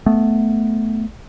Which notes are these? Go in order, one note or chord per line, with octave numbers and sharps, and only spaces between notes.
A3 B3